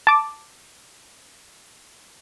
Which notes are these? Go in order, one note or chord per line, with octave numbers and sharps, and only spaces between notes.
A5 D6